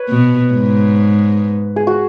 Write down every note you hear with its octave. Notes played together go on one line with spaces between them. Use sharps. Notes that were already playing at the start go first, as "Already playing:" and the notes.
Already playing: B4 C#5
B2
G#2
G#4
F#4